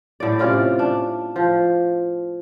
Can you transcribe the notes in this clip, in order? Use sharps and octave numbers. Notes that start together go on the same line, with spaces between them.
A2 D5
C3 C#4 F4 D5
D4
F3